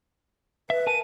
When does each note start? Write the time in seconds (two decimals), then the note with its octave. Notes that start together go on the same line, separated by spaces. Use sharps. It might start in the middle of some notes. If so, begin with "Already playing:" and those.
0.70 B4 E5
0.87 A#4 G#5 A5 D#7